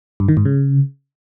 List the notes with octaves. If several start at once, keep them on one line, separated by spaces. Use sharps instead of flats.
G2
D#3
G#2
C#3